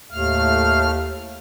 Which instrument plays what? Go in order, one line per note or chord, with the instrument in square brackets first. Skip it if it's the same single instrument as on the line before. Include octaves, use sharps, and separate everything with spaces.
[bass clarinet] D#2 [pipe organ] A2 A3 F6 [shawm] F5